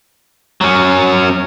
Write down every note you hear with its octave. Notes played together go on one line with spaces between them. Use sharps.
F#3 C#4